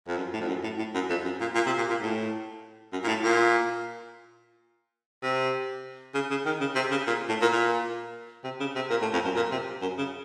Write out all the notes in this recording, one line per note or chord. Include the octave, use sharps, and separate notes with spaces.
F2
F#2
A2
F2
F#2
A2
A2
F#2
F2
F#2
A#2
A#2
C3
A#2
A#2
A2
F#2
A#2
A2
A#2
C3
C#3
C#3
D#3
C#3
C3
C#3
A#2
A2
A#2
A#2
C3
C#3
C3
A#2
A2
F2
F#2
A#2
C3
F#2
C#3